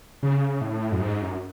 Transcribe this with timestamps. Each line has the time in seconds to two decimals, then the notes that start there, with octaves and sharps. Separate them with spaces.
0.23 C#3
0.61 A2
0.92 F#2
1.01 G#2
1.22 F#2